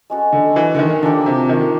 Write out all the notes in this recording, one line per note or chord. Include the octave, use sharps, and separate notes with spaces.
G#3 C#4 F#4 A4
D3
E3
D3
D#3
D3 F3 A#3 D4 G4
C3
D#3